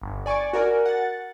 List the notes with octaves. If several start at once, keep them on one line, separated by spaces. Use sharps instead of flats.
G1
D5 G#5 C#6 A6 D7
F#4 A#4 D5 G#5
F#5 A6